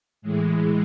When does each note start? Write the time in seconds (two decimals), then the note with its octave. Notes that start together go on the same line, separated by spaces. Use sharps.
0.22 A2 E3 G#3